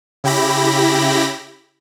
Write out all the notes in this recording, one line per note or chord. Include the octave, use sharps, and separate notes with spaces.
C#3 E4 G4 B5 A#6